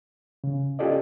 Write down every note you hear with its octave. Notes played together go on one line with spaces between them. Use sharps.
C#3
C#4 F4 G4 A4 D5 D#5